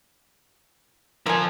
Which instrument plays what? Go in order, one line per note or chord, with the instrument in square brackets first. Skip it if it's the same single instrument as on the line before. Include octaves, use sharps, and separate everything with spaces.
[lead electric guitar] F3 A4 [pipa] A#4 G#5